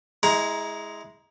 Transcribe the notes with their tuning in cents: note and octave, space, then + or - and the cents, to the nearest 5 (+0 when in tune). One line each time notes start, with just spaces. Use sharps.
G#3 +0 E4 -25 A#5 +20